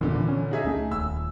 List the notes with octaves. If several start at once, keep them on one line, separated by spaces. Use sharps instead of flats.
D#1 F2 A#2 D3 E3
E3
C#4
D#4 G#4 E5
C#2 A3
D#1 E6